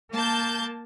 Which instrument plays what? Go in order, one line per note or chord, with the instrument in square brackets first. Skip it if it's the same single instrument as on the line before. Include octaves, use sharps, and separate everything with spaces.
[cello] A#3 [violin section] A5 G6